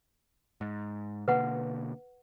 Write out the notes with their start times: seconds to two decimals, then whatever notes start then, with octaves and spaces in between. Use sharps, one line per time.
0.61 G#2
1.28 B2 D3 A#3 B4 F#5